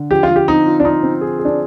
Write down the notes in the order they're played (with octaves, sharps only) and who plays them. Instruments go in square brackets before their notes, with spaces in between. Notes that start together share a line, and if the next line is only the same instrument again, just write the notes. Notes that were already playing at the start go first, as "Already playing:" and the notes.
Already playing: [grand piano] D3
[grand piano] F3 [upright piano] G4
[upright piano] F4
[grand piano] F3
[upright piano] G4
[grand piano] C4 [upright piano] D#4
[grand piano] F4
[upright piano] D4
[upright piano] D#4 [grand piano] F4
[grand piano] C4
G#4
G#4
[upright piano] D4